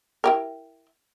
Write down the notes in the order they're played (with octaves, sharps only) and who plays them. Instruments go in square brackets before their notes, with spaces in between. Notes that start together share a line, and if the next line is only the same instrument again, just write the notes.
[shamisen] E4 G4 A#4